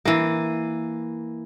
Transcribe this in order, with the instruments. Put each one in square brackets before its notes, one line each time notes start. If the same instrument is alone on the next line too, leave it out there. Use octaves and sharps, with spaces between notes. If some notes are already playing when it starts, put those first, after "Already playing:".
[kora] E3 A#3